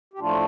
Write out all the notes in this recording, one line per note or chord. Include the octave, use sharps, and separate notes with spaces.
G4
A2 F3 A3 D4 F4